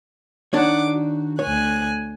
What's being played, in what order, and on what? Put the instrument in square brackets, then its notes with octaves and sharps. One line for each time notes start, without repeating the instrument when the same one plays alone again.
[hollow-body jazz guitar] D#3 D4 C#5 [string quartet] F#5 D6
[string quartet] F#4
[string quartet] D2 G#5 F#6 [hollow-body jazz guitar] C#5